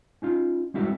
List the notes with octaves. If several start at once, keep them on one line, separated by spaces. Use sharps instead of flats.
C#4 D#4 F4
G3 G#3 C4 E4 F#4 A4